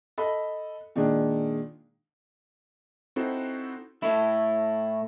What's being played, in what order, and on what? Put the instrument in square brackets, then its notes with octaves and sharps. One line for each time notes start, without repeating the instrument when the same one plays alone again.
[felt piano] A4 D#5 B5
A#2 D#3 G#3 D4
[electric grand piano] C4 D#4 E4 F#4 A4 C5
[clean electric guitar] A2 E4